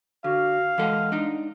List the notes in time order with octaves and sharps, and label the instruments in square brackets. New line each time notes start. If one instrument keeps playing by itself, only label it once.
[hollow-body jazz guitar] D3 [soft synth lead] F#4 [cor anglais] F5
[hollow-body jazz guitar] E3 A4 F#5 [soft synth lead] G#3
[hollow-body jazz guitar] D4 D#4